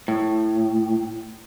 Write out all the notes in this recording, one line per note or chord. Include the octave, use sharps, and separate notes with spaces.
A2